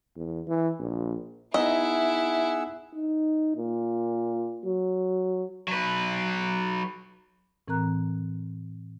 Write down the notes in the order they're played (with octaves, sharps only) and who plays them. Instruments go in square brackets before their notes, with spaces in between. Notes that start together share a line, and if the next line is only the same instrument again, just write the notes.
[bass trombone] E2
E3
A#1
[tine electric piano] B3 D#4 E5 [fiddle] E4 [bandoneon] G#4 F#5 E6 [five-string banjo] D#5
[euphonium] D#4
A#2
F#3
[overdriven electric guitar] F#3 B4
[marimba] A2 E3 C4 A#4 A#5 F#6